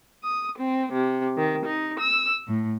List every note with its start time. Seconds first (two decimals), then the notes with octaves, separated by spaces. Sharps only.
0.24 D#6
0.57 C4
0.92 C3
1.36 D#3
1.66 D#4
1.99 E6
2.46 A2